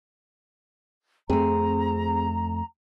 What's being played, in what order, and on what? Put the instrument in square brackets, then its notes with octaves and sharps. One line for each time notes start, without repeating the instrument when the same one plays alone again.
[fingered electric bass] F2 A3 [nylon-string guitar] C4 G#4 [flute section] A#5